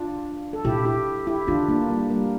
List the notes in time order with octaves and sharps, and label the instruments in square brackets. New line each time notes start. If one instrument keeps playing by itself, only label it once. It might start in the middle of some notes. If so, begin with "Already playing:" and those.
Already playing: [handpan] D4 F4
A4
[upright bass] A#2 [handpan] E4 G4
[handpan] E4 G4
E4 G4
[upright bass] D3 [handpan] D4 F4
[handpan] A#3 D4
G3 A#3
G3 A#3